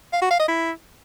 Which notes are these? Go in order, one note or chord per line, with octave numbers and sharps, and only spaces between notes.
F5
F#4
F5
D#5
E4